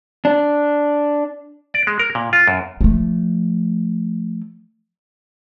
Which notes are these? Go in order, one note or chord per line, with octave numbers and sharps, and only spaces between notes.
D4
D5
G#3
A#4
A#2
F4
F#2
F3 A3